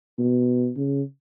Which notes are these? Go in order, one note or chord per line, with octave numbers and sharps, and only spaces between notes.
B2
C#3